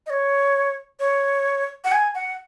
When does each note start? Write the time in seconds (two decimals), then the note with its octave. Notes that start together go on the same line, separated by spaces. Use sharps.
0.07 D#5
0.10 C#5
1.00 C#5
1.84 F#5
1.92 G#5
2.15 F#5